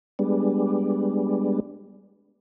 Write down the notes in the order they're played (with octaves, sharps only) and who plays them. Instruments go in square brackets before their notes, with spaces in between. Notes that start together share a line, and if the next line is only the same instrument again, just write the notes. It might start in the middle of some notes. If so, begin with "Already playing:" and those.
[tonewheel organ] G3 G#3 B3 D4